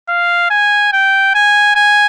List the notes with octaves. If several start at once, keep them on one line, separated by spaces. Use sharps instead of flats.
F5
G#5
G5
G#5
G#5